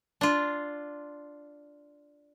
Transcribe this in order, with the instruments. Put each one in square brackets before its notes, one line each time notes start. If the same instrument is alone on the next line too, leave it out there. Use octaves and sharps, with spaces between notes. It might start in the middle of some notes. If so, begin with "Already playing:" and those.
[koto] D4 F4